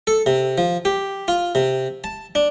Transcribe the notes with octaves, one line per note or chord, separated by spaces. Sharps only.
A4
C3
F3
G4
F4
C3
A5
D4